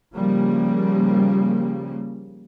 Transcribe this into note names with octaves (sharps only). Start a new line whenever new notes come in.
C#3 F3 G3 A#3